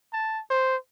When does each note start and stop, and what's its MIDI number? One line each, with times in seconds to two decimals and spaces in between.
0.13 0.40 81
0.50 0.76 72